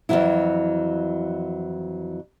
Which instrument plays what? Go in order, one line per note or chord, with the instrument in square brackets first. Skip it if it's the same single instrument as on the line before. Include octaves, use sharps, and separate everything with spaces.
[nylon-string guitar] F2 B2 E3 F#3 E4